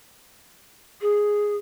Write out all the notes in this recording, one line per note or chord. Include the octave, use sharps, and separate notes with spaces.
G#4